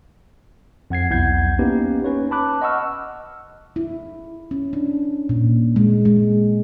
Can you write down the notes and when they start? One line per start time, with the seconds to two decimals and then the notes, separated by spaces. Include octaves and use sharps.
0.90 F2 F#5 G#6 C7
1.10 B1 E2 E4 F#5 G6 G#6
1.59 A#3 B3 C#4 D#4 G4 B4
2.04 C#4 B4 C#5
2.31 A5 B5 D6 F#6
2.61 D#5 F#5 C#6 E6 F6
3.76 E4
4.51 C#4
4.73 D4
5.29 A#2
5.76 G#3
6.05 G#3